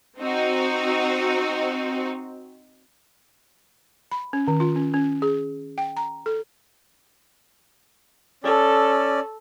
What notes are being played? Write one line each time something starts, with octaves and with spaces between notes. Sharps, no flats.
C4 D#4 F#4
B5
C#4
D#3
F4
C#4
C#4
G#4
G5
A#5
A4
C#4 A4 D5